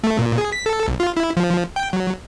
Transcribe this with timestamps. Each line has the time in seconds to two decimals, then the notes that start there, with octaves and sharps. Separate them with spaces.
0.04 A3
0.19 A#2
0.38 G#4
0.53 B6
0.66 A4
0.88 B1
1.00 F4
1.17 E4
1.37 F3
1.76 G5
1.93 F#3